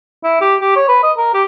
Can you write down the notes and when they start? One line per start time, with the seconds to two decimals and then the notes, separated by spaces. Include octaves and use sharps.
0.24 E4
0.41 G4
0.61 G4
0.76 C#5
0.89 B4
1.03 D#5
1.18 A#4
1.34 G4